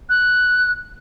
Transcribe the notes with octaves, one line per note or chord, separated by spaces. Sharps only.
F#6